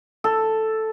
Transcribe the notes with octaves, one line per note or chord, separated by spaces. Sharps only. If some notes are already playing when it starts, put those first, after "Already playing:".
A4